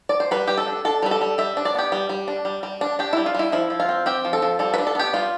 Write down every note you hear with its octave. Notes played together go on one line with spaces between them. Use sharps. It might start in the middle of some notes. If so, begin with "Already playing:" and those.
D5
C5
G3 B4
G3 G4
A4
D4
D4 A4
G3 B4
A4
G3
G3 E5
D4
D5
B3 G4
G3
G3
D4
G3
G3
D4
D4 G4
G3 E4
F4
G3 E4
F3 E4
F3
F4
C4
C4 G4
F3
A4
F3
G3 A4
B4
D4
A4
B3 G4
G3 F4